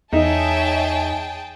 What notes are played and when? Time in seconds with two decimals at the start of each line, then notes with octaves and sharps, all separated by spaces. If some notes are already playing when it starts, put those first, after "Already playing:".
0.13 E2 D#4 G#4 C#5 E5 G5 A5